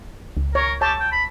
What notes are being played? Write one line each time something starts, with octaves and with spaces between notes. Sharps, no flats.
C#2
A#4 C#5
G4 C#5 A5
G5
B5